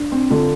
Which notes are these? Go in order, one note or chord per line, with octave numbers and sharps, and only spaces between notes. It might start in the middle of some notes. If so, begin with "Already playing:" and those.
Already playing: D4
C4
D3 F4